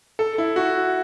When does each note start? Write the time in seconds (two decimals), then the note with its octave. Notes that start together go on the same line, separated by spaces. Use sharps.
0.19 A4
0.38 E4
0.56 F#4